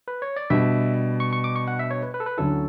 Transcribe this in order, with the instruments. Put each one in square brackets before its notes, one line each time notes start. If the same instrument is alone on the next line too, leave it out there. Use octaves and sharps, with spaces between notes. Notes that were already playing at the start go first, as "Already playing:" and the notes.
[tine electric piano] B4
C#5
D5
[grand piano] B2 G3 D4 [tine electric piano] E5
[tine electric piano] C#6
C#6
D6
C#6
F#5
E5
C#5
B4
B4
A4
B4
[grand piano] D2 D3 F#3 C#4 E4 [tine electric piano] A4